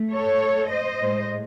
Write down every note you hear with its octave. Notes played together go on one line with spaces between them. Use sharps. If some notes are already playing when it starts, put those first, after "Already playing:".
Already playing: A3
A4 C#5
C5 D#5
A2 G#3